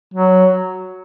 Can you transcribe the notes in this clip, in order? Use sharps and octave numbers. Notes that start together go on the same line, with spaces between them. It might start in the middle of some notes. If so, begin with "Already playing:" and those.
F#3